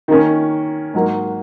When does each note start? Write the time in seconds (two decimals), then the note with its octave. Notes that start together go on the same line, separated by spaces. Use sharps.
0.08 D#3 A#3 C#4
0.94 G#2 F#3 A#3